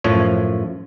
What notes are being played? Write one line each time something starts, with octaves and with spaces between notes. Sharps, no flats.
F#2 A2 F3 C#5